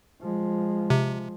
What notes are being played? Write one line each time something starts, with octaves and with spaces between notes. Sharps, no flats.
F3 G#3
C3